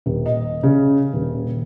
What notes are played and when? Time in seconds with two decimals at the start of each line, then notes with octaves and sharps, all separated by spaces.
0.06 D#1
0.26 D#5
0.63 C#3
1.13 D#1